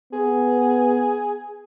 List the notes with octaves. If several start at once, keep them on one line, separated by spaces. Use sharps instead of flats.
B3 G#4